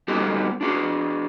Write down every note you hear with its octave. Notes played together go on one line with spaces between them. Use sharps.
G3 B3 D#4 F#4 G4 A4
D4 F#4 G#4